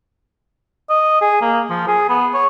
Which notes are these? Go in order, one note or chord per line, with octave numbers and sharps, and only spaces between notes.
D#5
G#4
A#3
F3
G#4
B3
C#5